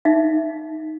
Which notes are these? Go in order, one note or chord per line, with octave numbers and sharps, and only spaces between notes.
D#4 E5 F5